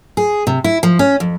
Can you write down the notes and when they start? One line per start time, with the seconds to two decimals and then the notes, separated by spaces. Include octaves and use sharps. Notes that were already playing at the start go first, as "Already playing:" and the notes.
0.17 G#4
0.47 C3
0.64 E4
0.83 F3
0.99 C#4
1.20 F2